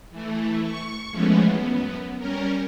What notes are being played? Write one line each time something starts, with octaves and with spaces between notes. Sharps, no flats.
E3 A3
C#6
E3 F3 G#3 A3 B3 C#4
F#2 B3
G3 C#4 A#4